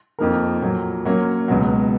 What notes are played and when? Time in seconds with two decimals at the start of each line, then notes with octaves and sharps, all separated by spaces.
0.19 F2 F3 A#3 D#4 A#4
0.62 A#2 F#3 A#3
1.05 F#3 A#3 C#4
1.48 C#2 B2 F#3